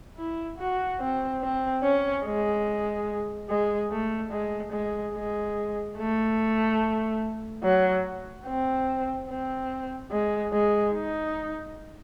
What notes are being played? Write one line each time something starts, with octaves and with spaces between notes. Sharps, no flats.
E4
F#4
C4
C4
C#4
G#3
G#3
A3
G#3
G#3
G#3
A3
F#3
C4
C4
G#3
G#3
D#4